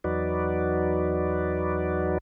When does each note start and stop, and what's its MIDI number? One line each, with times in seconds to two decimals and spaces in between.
0.04 2.18 40
0.04 2.18 54
0.04 2.18 63
0.04 2.18 66
0.04 2.18 71
0.04 2.18 74